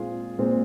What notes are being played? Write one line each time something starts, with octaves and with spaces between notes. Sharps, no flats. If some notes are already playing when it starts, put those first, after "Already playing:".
Already playing: A#2 G#3 C4 F4 G#4
A#2 G#3 C4